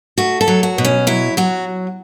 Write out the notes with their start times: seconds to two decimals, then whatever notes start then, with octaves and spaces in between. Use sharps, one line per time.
0.18 A3 F#4
0.41 A4
0.48 F#3
0.63 F#4
0.78 B2
0.85 C#4
1.07 F#3 E4
1.37 F#3 F#4